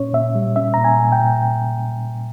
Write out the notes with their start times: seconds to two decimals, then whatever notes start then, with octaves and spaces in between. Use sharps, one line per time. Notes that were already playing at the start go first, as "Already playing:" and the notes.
Already playing: A#2 C#4 C#5
0.13 A#2 E5
0.35 G3
0.56 C#4 E5
0.74 A#2 A#5
0.84 G#5
0.99 A#2
1.12 G5
1.20 A#2